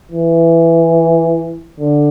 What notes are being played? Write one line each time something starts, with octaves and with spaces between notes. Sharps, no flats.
E3
D3